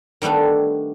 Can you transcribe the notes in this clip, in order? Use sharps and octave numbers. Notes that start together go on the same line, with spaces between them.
D#3 G3 A3 B3 D4